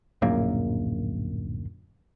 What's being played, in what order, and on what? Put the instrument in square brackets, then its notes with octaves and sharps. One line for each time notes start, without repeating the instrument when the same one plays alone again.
[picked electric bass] D1 A#1 F#2 A#3